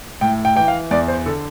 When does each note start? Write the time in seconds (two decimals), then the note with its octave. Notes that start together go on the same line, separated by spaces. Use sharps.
0.21 A2 G5
0.45 G5
0.56 E3 G5
0.68 F5
0.91 E2 D5
1.08 C5
1.26 D3 A4